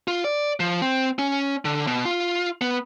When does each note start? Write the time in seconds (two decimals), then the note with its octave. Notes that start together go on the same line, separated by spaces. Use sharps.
0.08 F4
0.25 D5
0.60 F3
0.82 C4
1.19 C#4
1.65 D3
1.87 B2
2.05 F4
2.61 B3